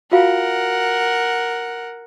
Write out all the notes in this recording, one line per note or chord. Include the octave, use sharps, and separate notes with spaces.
F4 F#4 A#4 F5 F#5